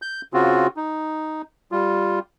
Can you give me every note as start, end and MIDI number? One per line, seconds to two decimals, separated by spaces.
0.02 0.21 91
0.34 0.67 49
0.34 0.67 60
0.34 0.67 65
0.34 0.67 66
0.77 1.42 63
1.72 2.19 55
1.72 2.19 65